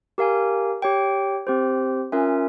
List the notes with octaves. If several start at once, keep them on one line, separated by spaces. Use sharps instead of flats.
G4 A#4 F5 G#5
G4 C#5 G5
C4 G4 C5
C#4 F4 A#4 E5 G#5